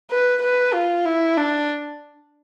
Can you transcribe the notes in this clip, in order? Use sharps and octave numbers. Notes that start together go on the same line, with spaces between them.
B4
B4
F4
E4
D4